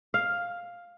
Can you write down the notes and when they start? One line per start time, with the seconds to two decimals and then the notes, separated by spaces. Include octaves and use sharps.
0.14 F5